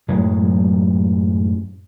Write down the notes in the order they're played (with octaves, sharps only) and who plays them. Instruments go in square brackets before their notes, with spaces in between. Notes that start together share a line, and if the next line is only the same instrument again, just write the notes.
[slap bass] F#2 A2 F#3 G#3